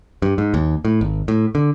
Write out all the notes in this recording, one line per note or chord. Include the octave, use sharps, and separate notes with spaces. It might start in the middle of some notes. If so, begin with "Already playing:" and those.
G2
G#2
D#2
A2
G#1
A2
D3